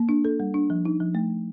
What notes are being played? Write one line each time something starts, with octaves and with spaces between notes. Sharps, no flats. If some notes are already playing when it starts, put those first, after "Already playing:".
Already playing: A#3
D4
A4
G3
D4
F3
D#4
F3
A3